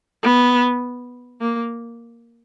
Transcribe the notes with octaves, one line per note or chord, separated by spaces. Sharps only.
B3
A#3